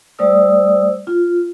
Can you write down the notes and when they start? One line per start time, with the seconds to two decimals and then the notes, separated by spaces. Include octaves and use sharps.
0.19 G3 A3 C5 D5 D#6 E6
1.07 F4